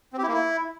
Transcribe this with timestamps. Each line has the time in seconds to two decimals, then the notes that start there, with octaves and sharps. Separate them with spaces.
0.13 C4
0.18 G4
0.23 E4
0.28 A#3
0.33 E4